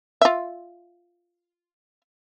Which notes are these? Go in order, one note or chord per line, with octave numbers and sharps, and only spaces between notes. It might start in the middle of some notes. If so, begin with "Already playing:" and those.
F4 E5